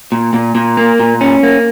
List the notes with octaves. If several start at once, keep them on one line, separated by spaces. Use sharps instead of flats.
A#2
A#2
A#2
A#3
A#2
C#4
A#3